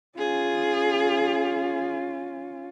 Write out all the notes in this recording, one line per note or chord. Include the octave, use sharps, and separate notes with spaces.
C#4 F4 G#4